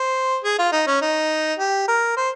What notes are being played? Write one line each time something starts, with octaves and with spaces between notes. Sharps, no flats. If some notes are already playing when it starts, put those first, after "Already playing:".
Already playing: C5
G#4
F4
D#4
C#4
D#4
G4
A#4
C5